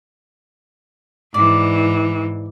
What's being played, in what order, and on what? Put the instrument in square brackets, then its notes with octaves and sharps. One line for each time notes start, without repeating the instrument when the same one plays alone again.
[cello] G#2 E3 [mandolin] D5